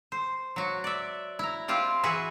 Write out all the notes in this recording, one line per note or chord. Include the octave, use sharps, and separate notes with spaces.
C5
F#3 F#4
D5 E5
E4 A#5
G3 C4 F4 G4
E3 F#4 G#4 B4 E5